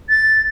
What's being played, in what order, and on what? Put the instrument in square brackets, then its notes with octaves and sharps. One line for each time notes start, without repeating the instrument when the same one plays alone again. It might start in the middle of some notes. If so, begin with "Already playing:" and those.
[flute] A6